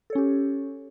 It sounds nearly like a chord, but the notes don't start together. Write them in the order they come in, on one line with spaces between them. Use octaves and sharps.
A4 C#5 C#4 G4